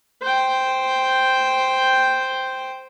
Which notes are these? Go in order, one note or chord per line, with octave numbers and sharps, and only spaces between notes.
C5 G5